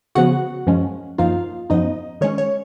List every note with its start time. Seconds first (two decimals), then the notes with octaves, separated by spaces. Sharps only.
0.15 C#3 F3 B3 F#4 F#5
0.67 F#2 F3 G#3 C#4
1.18 F#2 F3 A#3 D#4 F4 F5
1.70 F#2 F3 B3 D#4 D#5
2.21 D#3 G#3 C#4 C#5
2.38 C#5